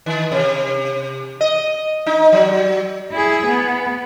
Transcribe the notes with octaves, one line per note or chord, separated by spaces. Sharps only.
D#3
C3
D#5
D#4
F#3
E4 G#4
B3